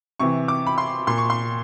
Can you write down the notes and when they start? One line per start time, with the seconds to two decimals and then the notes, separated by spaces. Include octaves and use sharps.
0.20 C3 E3 C#6
0.48 D6
0.67 B5
0.78 C6
1.07 A#2 C6
1.18 C#6
1.30 C6